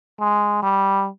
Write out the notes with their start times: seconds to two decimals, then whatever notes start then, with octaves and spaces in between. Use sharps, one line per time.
0.20 G#3
0.63 G3